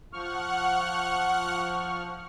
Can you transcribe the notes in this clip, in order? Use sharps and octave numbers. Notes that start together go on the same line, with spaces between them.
F3 F#5 C#6 F6